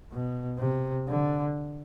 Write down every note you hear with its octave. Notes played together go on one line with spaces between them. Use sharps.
B2
C3
D3